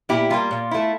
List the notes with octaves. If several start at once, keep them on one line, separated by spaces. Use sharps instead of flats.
A#2 E4 G4
G3 A#3 F4
A#2
A3 E4